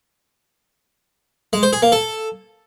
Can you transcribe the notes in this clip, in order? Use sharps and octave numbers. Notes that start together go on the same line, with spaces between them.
G#3
C5
G#4
A#3
A4